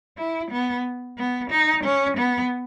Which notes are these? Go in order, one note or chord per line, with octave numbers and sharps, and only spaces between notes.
E4
B3
B3
D#4
C#4
B3